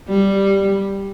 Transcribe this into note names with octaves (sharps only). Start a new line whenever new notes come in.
G3